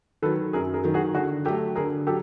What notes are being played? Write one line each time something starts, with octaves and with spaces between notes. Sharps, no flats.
D#3 F#3 A4 B4
F#2 G#4 A#4
G#4 A#4
D#3 F#3
F#4 G#4
D3 F#4 G#4
F#3 A3 G4 A4
D3 G#4 A#4
F#3 G4 A4